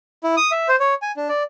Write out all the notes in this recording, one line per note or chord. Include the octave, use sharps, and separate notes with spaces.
E4
D#6
E5
C5
C#5
G#5
D4
D5